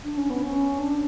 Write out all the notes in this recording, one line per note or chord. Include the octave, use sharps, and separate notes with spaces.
D4
C#4
B3
C#4
D4